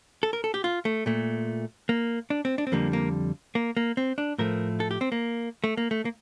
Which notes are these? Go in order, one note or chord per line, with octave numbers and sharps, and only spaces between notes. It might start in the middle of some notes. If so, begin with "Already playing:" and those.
A4
A#4
A4
G4
F4
A3
A#2 A3
A#3
D4
C4
D4
C4
F2 D3 G3 A#3
A#3
A#3
A#3
C4
D4
A2 F3 A3 A#4
A4
G4
C4
A#3
A3
A#3
A3
A#3